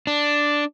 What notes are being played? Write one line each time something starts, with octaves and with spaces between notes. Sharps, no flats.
D4